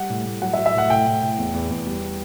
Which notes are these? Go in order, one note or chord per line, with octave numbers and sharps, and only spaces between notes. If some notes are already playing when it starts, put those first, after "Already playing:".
Already playing: G3 F#5
A2
A2
F#3 F#5
E5
F#3
E5
A2 F#5
A2 G5
A2
A2
E2
E2
E2
G3